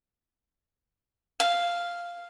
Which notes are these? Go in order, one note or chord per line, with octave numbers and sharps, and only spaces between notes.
F5